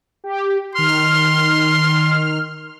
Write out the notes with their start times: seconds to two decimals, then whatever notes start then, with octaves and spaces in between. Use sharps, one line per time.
0.24 G4
0.75 D#3 C6 F6